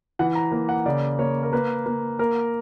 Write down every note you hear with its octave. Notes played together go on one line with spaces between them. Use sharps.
E3 F#5
A#5
A#3
F#5
C#3 D5
A#3 C#5
A#4
A#3 B4
A#3
A#3 A#4